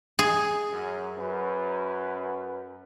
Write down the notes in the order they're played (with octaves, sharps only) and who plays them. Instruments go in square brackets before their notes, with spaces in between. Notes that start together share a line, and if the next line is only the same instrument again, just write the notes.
[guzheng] G#4
[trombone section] F#2
F#2 B4